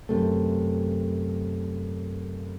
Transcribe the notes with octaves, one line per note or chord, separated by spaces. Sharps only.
F#2 C3 A3